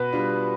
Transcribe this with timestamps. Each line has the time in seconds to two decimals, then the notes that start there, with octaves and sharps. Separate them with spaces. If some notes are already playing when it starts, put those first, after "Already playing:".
Already playing: B2 B4
0.12 G3 D4 F4